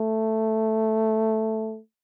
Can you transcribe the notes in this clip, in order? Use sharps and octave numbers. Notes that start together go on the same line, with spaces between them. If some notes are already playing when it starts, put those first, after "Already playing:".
Already playing: A3